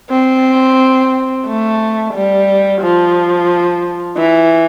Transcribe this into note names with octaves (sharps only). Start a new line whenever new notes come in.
C4
A3
G3
F3
E3